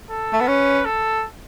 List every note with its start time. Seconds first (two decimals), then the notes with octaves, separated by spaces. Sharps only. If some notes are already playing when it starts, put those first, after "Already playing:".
0.10 A4
0.33 A3
0.41 B3
0.47 C#4 B4
0.85 A4